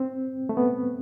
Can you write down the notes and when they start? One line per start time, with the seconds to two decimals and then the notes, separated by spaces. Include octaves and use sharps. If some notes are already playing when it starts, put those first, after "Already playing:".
Already playing: C4
0.49 A3
0.57 B3